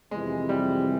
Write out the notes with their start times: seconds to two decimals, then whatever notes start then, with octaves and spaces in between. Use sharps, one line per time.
0.11 F2 C3 E3 G#3
0.49 G3